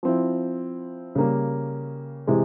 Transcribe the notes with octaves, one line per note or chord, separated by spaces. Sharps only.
F3 C4 E4
C#3 G3 A#3 C#4
C3 E3 G#3